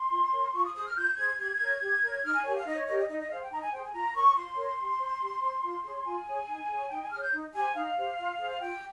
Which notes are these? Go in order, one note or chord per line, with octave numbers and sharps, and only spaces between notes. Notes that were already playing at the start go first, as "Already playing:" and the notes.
Already playing: C6
F4
A#4 C#5
F4 C#6
D#6
G#4 C5 D#6
F6
F4 G6
G#4 C5 G#6
G4 G#6
A#4 C#5
G4
A#4 C#5
D#4 F6
G#5
G4 A#4 C#5 G#5
F5
D#4 D#5
C#5
G4 A#4 C#5 D#5
D#5
D#4 D#5
D#5
G#4 C5 F5
G5
D#4 A#5
G#5
G#4 C5 G5
G#5
F4 A#5
A#4 C#5 C#6
F4 C6
A#4 C#5
G4
C5
G4
C5
F4
G#4 C#5
F4 G#5
G#4 C#5
D#4
G#4 C#5
D#4 G5
G#5
G#4 C#5 F6
G6
D#4
G4 C5 G#5
D#4 F5
G4 C5
F4
G#4 C5
F4 G5